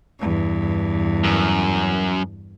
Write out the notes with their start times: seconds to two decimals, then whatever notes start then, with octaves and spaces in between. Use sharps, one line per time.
0.19 E2 G2
1.24 F#2